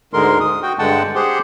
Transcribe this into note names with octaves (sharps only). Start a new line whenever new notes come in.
D2 G#2 D3 G#3 A#4 C6
D#6
F#4 G5
G2 D3 G#3 F#5 G5 A5
G4 G#4 C5 F#5 C6